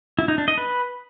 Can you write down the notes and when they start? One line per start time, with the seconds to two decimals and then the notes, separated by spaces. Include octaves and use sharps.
0.19 E4
0.28 D#4
0.38 D4
0.48 D#5
0.58 B4